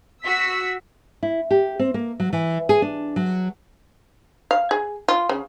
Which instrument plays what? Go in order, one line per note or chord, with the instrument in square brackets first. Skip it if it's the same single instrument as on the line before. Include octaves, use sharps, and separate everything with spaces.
[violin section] F#4 E6 B6
[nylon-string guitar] E4
G4
C4
A#3
F#3
E3
G#4
D4
F#3
[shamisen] F5
G#4
F4
C#3